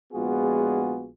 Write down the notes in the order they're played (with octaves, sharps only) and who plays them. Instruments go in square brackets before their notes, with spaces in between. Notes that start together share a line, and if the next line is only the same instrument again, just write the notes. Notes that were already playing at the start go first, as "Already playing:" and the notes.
[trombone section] A#1 G#3 B3 F4 F#4 G#4